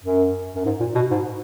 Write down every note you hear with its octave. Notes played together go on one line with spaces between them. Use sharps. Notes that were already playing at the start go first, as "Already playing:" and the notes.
F#2
F#2
G#2
A#2
B2
G#2